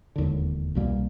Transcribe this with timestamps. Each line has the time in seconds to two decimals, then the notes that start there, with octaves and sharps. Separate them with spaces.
0.16 E1 D#2 D3
0.75 C2 B2 G3 A#3